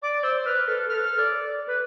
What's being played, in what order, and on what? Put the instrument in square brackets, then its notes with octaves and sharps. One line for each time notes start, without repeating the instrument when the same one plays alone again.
[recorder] D5 [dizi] D6
[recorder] C5 [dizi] E6
[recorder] B4 [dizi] F6
[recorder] A4 [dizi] F6
[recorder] B4 [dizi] F6
[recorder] A4
D5
B4